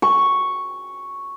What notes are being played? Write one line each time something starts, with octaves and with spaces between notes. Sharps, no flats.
C#6